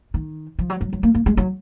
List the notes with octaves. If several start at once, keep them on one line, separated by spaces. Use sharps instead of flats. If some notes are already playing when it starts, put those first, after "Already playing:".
D#3
F3
F#3
F#3
F#3
A#3
A#3
G#3
F#3